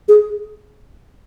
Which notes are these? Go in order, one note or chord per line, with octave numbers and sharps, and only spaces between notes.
G#4